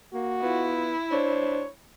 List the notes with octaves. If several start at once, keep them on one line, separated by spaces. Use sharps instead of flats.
A#3 F#4
B3 E4 F4
D4 C5 C#5